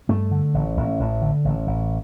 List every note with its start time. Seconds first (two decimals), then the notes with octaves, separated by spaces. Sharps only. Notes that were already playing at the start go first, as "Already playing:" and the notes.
0.09 G2 A3
0.31 D3
0.54 A1
0.77 A1
1.00 A1
1.22 D3
1.45 A1
1.67 A1